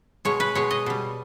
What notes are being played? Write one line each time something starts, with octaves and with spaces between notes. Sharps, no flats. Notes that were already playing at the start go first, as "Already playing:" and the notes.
B2 G#3 C#5
B4
B2 G#3 C#5
D#5
B2 G3